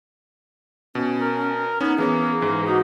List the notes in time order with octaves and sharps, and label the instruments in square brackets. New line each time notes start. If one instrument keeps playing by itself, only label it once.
[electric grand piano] B2 [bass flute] C#4
[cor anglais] A#4
[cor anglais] B3 [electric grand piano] C#4 [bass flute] D#4
[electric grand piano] E3 B3 C#4 [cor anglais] A#3 [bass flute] G#4
[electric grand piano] G#2 E3 [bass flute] G#4
[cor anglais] D#4 [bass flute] F#4